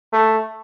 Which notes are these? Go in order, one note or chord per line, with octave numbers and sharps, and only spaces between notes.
A3